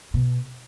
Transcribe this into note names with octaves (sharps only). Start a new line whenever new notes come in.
B2